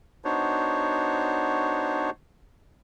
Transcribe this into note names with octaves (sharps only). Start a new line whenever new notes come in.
B3 D4 D#4 F#4 C5 C#5